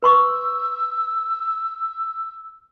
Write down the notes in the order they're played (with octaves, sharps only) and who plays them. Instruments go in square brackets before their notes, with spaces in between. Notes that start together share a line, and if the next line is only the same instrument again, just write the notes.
[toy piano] B4 C6 C#6 [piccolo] E6